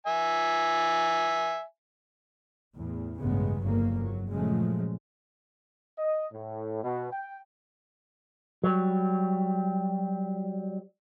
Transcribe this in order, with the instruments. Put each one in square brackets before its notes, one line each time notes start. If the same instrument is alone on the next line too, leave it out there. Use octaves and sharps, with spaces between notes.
[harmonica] E5 G#5
[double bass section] E2 A2
A1 E2 G2 C#3 G#3 B3
G1 F2 C#3 F#3 A#3
F#3
A#2 C#3 F3 F#3 G#3 A3
[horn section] D#5
A2
B2
G5
[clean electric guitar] F#3 G3